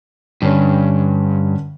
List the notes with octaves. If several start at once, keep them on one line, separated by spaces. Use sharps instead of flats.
G2 D3 C#4